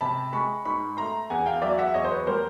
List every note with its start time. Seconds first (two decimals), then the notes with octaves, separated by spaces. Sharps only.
0.01 C3 A5 B5
0.32 G#3 B5 C#6
0.65 G#2 B5 C#6
0.97 A3 A#5 C6
1.30 E2 F#5 G#5
1.46 F5 G5
1.62 F#3 D5 E5
1.78 E5 F#5
1.94 E2 C#5 D#5
2.04 C5
2.10 B4 C#5
2.27 G3 A#4 C5